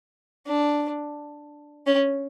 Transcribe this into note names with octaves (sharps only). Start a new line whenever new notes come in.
D4
C#4